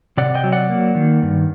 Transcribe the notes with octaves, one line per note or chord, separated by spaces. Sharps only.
C3 D5 F#5
D#5 G5
F#3
D5 F#5
A#3
D#3
G2